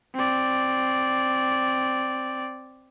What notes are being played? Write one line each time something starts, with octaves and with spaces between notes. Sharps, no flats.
C4 D5